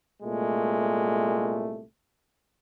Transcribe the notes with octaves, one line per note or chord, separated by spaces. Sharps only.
C2 A#2 G#3 A3